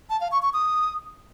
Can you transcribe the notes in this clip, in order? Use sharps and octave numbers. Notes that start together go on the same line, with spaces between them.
A5
F5
C#6
C#6
D#6